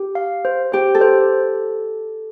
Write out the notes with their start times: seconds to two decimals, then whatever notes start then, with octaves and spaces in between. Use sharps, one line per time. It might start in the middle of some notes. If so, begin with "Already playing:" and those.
Already playing: G4
0.15 F5
0.45 C5
0.72 G4 C5
0.95 A4
1.01 C5